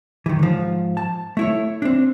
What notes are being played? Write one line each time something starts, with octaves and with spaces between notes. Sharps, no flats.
D#3 E3
G#2 F3
A5
A3 E4 C#5
C4 D4